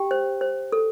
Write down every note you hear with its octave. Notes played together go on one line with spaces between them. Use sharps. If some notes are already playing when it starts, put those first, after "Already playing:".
Already playing: G4 G5
C5
C5
A4